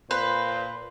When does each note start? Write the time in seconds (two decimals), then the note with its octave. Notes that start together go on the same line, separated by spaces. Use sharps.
0.11 A#2 B4 C5